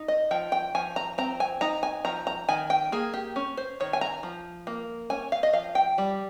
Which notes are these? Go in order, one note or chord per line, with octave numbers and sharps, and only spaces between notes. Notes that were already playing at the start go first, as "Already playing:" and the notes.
Already playing: D#4
D#5
F3 G5
G5
F3 G#5
A#5
C4 A#5
G#5
D#4 A#5
G#5
F3 A#5
A#5
D#3 G#5
G5
A#3 G#4
G4
C#4
C5
D#3 C#5
G#5
A#5
F3
A#3
C#4 G#5
F5
D#5
F3 F5
G5
G3